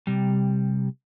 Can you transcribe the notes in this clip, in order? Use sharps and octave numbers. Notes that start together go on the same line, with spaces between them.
C3 G3